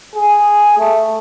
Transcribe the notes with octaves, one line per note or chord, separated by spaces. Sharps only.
G#4
A3